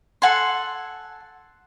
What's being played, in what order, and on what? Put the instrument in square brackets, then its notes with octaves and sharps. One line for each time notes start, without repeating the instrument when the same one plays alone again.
[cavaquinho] A4 F#5 G#5 C6